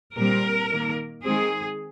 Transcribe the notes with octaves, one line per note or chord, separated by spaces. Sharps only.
A#2 G3 C4 A#4
D#3 A#3
D#3 G#3 C4 G#4